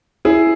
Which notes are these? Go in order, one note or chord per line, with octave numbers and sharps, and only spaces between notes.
E4 G#4